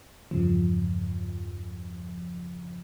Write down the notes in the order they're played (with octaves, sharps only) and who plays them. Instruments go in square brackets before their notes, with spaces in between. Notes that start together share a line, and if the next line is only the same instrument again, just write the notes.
[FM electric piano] E2 G2 C#3 F3